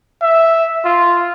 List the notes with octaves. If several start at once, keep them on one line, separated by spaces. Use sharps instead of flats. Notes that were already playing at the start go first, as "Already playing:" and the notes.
E5
F4